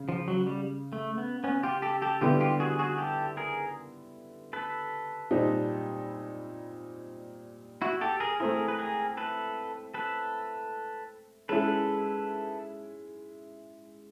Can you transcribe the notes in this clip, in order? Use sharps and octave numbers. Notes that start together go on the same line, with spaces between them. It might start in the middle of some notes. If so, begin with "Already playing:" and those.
Already playing: C#3
F3
F#3
G3
A3
B3
B3 C#4
F4 G4
G4 A4
G4 A4
D3 G3 B3 E4 F4 G4
F4 G4
F#4 G#4
F#4 G#4
G4 A4
G#4 A#4
A4 B4
A#2 G3 C4 D#4
E4 F#4
G4 A4
G#4 A#4
A3 C4 E4 G#4 A#4
B4
G#4 A#4
A4 B4
A4 B4
G#3 C#4 E4 G#4 A4 B4